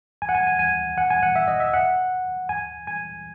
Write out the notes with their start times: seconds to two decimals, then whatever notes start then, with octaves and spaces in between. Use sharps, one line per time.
0.22 G#5
0.29 F#5
0.35 G#5
0.47 G#5
0.59 G#5
0.98 F#5
1.10 G#5
1.23 F#5
1.36 E5
1.48 D#5
1.60 E5
1.74 F#5
2.49 G#5
2.87 G#5